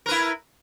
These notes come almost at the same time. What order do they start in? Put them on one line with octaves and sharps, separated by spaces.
A#4 B4 E4